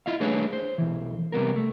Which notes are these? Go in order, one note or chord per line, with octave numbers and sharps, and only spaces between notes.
E4 F4 D#5 F5
G3 A3 D4 G#4 B4 C#5
C5
B1 E3
C3 G3 B3 A#4
A3